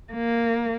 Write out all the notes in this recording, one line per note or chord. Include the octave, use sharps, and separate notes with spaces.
A#3